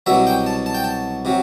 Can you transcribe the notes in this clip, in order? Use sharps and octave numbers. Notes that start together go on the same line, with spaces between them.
C2 B2 F#3 E5
G5
A5
A5
G5
A5
C3 F#3